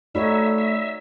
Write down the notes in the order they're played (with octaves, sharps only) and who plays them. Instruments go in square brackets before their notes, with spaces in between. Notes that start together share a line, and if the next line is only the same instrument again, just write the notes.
[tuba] A3 [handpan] D#4 F#4 C#5 [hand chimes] D5 B5 E6 [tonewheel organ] E5
[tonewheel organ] E5